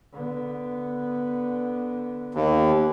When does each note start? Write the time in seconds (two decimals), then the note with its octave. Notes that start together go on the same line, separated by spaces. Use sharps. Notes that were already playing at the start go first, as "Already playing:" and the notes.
0.13 D3 B3
2.35 D#2